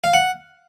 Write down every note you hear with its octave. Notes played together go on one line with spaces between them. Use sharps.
F5
F#5